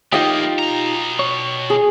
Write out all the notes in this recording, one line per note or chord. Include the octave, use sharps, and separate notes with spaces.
F3 A#3 D#4 F4 G4 D#5 G5
B2 A#5
C#5
G#4